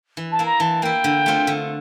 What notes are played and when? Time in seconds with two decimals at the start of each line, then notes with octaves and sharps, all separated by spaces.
0.17 E3
0.31 A5
0.39 A#3 E4
0.45 A#5
0.60 E3 A5
0.82 A#3 E4 G5
1.04 D3
1.26 A3 C4 F4
1.47 D3